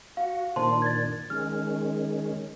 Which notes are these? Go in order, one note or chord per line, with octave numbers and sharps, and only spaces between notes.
F#4 F5
A#2 D#3 D4 C5 A5 C6
G#6 A6
D#3 G#3 C#4 F6